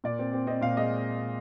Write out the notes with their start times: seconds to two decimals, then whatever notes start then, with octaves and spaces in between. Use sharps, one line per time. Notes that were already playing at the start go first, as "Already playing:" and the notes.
0.04 A#2 D5
0.19 C4
0.33 C4
0.47 C4 D#5
0.61 A#2 F5
0.77 G#3 D#5